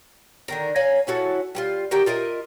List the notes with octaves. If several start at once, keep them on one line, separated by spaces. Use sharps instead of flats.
D3 D#3 A#4
C#5 F5 G#5 A#5
C#4 E4 F#4 A4
G3 E4 F4
F#4 G4 A#4 G5
F4 A#4 D#5 E5